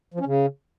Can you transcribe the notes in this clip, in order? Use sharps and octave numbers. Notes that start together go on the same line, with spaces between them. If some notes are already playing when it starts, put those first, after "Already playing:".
F3
C#4
C#3